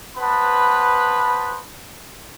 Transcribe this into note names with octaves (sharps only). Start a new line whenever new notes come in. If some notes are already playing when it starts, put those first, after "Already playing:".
B3 B4 C5 A5 B5